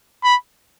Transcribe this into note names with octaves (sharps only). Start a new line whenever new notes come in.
B5